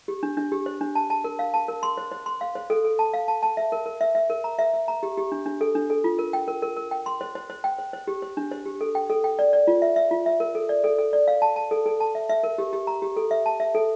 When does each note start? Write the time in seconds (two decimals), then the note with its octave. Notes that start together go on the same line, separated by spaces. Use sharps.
0.08 G4
0.23 D4
0.37 D4
0.52 G4
0.66 C5
0.81 D4
0.95 A5
1.10 A5
1.24 A#4
1.39 F5
1.54 A5
1.68 A#4
1.83 C6
1.98 C5
2.11 C5
2.26 C6
2.41 F5
2.55 C5
2.70 A4
2.85 A4
2.99 A5
3.13 F5
3.28 A5
3.43 A5
3.57 E5
3.72 A#4
3.86 A#4
4.01 E5
4.15 E5
4.30 A#4
4.44 A#5
4.59 E5
4.73 E5
4.88 A#5
5.03 G4
5.17 G4
5.32 D4
5.46 D4
5.61 A4
5.75 D4
5.90 A4
6.04 F4
6.19 A#4
6.33 G5
6.48 A#4
6.62 A#4
6.77 A#4
6.91 G5
7.06 C6
7.21 C5
7.35 C5
7.50 C5
7.64 G5
7.79 C5
7.93 C5
8.07 G4
8.22 C5
8.37 D4
8.52 C5
8.66 G4
8.81 A4
8.95 G5
9.10 A4
9.24 G5
9.39 D5
9.53 D5
9.67 F4
9.82 E5
9.96 E5
10.11 F4
10.26 E5
10.40 A#4
10.55 A4
10.69 D5
10.84 A4
10.99 A4
11.13 D5
11.28 F5
11.42 A5
11.56 A5
11.71 A4
11.86 A4
12.00 A5
12.15 E5
12.29 E5
12.43 A#4
12.58 G4
12.73 G4
12.87 A#5
13.02 G4
13.17 A4
13.31 E5
13.46 A5
13.60 E5
13.75 A4